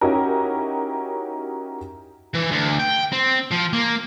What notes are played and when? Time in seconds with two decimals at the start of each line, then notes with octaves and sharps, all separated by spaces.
0.01 C#4 D#4 E4 F#4 G4 A#4
2.35 E3
2.52 D2
2.80 G5
3.13 C4
3.51 F3
3.73 A#3